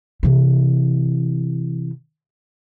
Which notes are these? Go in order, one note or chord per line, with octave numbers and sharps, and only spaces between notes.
C3 E3